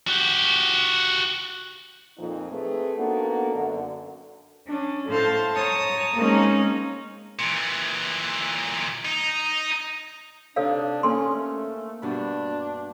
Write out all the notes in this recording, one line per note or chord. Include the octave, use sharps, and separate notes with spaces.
F#4 G4
F2 A#2 D#4
A3 C4 G#4 B4
A#3 B3 D4 D#4 F#4 A4
F#2 D3
C#4 D4
A2 A4 C5 F5 A5
C#5 A5 A#5 D#6
G#3 A#3 C4 C#4 D#4
A#2 E3
D#4
C3 D4 D#4 A4 C#5 F5
A#3 C#4 A4 C6
A3
G2 B2 D4 B5